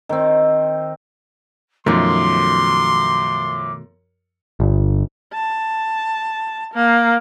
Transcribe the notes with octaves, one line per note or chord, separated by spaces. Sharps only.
D#3 C4
F#2 B2 D#3 F3 A3 C6 D6
G1
A5
A#3